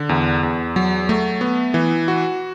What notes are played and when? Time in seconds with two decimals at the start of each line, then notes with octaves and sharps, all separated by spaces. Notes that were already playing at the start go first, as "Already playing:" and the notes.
Already playing: D3
0.09 E2
0.43 E2
0.76 F#3
1.09 A3
1.41 B3
1.74 E3
2.08 F#4